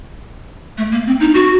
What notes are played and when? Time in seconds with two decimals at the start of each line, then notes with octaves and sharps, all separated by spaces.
0.78 A3
0.92 A#3
1.06 C4
1.20 D#4
1.34 F#4